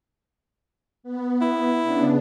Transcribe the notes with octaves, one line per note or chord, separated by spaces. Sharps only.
B3
E4
C#3 B3 D4